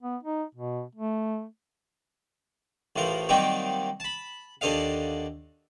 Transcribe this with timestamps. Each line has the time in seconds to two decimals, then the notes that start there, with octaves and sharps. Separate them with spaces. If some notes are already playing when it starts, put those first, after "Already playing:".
0.03 B3
0.23 D#4
0.55 B2
0.95 A3
2.96 A1 A2 F3 A#4
3.29 D#3 F#3 G3 A#3 C4 D#4
4.00 A5 B5
4.61 D#2 D3 A4 D#5 F5